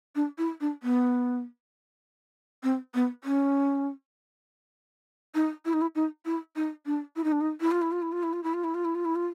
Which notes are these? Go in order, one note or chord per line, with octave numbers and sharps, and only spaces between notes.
D4
E4
D4
B3
C4
B3
C#4
D#4
E4
D#4
E4
D#4
E4
D#4
D4
E4
D#4
D4
D#4
E4
F4
E4
F4
E4
F4
E4
F4
E4
F4
E4
F4
E4
F4
E4
F4